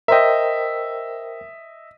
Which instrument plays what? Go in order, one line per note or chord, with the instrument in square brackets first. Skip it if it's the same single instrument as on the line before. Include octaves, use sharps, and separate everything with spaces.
[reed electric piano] A#4 C5 G5 [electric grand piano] D#5 E5